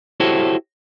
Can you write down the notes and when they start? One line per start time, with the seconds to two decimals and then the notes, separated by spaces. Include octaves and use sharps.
0.20 E4 F#4 G4 A4 C5 C#5